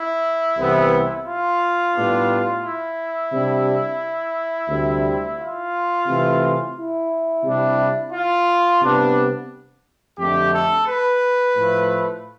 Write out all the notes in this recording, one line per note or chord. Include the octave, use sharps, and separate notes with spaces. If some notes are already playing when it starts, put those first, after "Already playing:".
Already playing: E4
C2 C3 E3 B3
F4
A2 G3 B3 D4
E4
C3 G3 D4
D2 C3 G3
F4
C3 E3 A3 C4
E4
C3 G3 D4
F4
C3 G3 B3 D4
F2 D3 A3 G4
A4
B4
A2 F3 A3